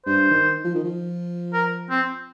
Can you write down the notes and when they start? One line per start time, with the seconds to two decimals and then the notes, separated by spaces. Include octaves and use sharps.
0.06 G2 C5
0.30 D#3
0.64 F3
0.74 D#3
0.83 F3
1.53 A#4
1.90 C4